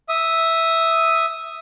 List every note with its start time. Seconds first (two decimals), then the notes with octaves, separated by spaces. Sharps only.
0.09 E5 D#6